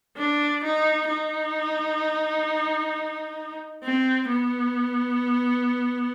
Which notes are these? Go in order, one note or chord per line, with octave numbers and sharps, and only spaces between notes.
D4
D#4
D#4
C4
B3